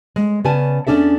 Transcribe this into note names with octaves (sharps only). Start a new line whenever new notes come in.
G#3
C#3 B3 C#4 D5 G#5 A5
E2 G3 C#4 D4 A4 E5